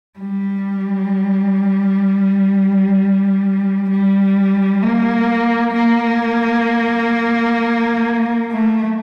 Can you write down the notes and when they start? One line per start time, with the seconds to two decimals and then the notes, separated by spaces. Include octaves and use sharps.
0.19 G3
3.89 G3
4.82 A#3
5.74 A#3
8.52 A3